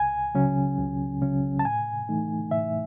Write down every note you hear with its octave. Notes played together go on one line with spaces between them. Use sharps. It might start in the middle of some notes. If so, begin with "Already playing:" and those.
Already playing: C#2 G#5
C#3 F#3 C#4
C#2
C#3 F#3 C#4
A5
A2 G#5
E3 A3 D#4
A2 E5